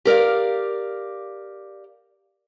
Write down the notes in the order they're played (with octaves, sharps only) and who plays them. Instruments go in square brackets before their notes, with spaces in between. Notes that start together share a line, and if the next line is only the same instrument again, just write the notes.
[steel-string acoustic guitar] G4 A#4 D5 F5